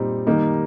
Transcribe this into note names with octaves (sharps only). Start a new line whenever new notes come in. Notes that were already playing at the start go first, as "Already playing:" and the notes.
Already playing: A#2 G3 C4 D#4
D#3 G3 A#3 D#4